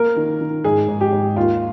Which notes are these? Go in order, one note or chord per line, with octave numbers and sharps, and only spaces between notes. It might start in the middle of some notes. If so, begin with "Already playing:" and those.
Already playing: A#3 A#4
D#3
D#3
G#2 G#4
G#2
G4
G#2
D#2 F4